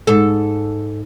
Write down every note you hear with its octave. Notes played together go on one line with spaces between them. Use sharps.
G#2 A4